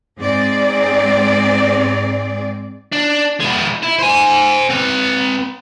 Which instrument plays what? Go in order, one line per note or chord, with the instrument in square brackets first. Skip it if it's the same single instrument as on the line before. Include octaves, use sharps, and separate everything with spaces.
[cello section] G#2 C4 G#4 D5
[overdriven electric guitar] D4
G#3 E4
E4
C5 G#5
C4 B4